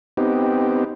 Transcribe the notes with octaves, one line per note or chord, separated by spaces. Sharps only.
B3 C4 D#4 G4